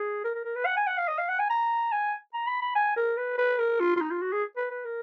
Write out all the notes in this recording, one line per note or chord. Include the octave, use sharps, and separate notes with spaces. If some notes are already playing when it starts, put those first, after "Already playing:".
Already playing: G#4
A#4
A#4
A#4
B4
F#5
G#5
F#5
F5
D#5
F5
F#5
G#5
A#5
G#5
A#5
B5
B5
G#5
A#4
B4
B4
A#4
F4
F4
D#4
F4
F#4
G#4
B4
B4
A#4